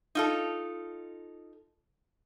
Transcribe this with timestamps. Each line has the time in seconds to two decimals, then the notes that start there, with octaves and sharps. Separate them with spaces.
0.15 D#4 F4 A4